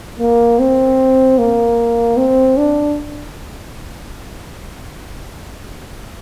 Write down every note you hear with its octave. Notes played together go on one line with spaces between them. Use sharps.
A#3
C4
A#3
C4
D4